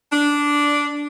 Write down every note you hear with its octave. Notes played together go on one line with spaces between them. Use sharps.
D4